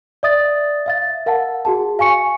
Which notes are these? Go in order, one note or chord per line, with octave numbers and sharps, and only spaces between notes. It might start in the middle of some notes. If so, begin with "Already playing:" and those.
D5 E5 D#6 A6
E5 F5 A6
A#4 F5 F#5 A5
F#4 G#4 A5
F5 G#5 C#6 C#7